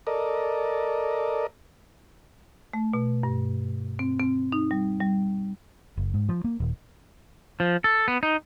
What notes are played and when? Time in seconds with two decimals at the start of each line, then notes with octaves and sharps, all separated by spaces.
0.07 A4 A#4 D5 D#5
2.73 A3
2.93 B2
3.23 G2
3.99 C4
4.19 C4
4.52 D#4
4.71 G3
5.01 G3
5.97 F#1
6.14 G#2
6.29 F3
6.44 A#3
6.60 D#1
7.60 F3
7.84 A4
8.08 B3
8.23 D#4